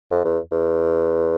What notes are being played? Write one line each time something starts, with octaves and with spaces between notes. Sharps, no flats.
F2
E2
E2